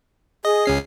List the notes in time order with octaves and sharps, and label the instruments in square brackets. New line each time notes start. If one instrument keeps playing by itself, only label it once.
[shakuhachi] G#4 [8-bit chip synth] D#5
[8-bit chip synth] C#2 C#4 C7